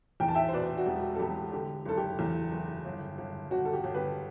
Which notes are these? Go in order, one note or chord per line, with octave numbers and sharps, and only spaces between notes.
E2 G5
A5
E5 G5
C5
B2 B4 D5
F#4
E1 G4
A4
E1 G4
D3 G4
F#1 A4
G4
E2
F#1
G1
G1
G1 F#4
A4
G4
G1
G4 B4